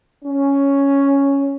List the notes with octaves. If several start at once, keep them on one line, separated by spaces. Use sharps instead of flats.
C#4